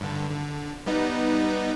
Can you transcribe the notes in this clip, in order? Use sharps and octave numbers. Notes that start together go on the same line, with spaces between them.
G2 D3
D3
G3 B3 D#4